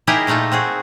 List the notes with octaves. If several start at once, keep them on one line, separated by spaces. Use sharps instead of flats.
D#4 E4 G4 G#4 A#4 D#5
A#2 A3 D#4 F4 A4
C4 F#4 G#4